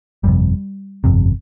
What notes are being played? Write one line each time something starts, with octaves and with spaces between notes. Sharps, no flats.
G1 F2 C3 G3
G1 F2 C3